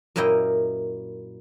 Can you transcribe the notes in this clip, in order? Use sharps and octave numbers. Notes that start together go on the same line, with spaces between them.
F#2 A#2 A#3 E4 D#5 G5